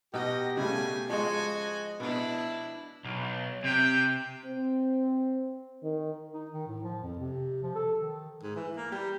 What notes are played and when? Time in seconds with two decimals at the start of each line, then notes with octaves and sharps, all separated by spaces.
0.14 B2 D#4 F#4 G4 D#5
0.57 C#3 G3 A3 G#5
1.09 F3 G#3 F#4 D#5 G#5
2.00 B2 D4 E4
3.04 B1
3.64 C3 G5
4.46 C4
5.84 D#3
6.33 D#4
6.51 D#3
6.68 A2
6.84 F3
7.02 F2
7.19 C3
7.63 F3
7.75 A4
8.00 D#3
8.43 G#2
8.56 E3
8.76 A#3
8.92 G3